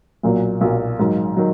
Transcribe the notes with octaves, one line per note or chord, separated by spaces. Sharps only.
B1 A#2 F#3 A#3
B1 A#2 F#3 A#3
G#2 D#3 F#3
D#3 F#3